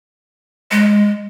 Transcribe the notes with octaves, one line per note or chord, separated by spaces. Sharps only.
G#3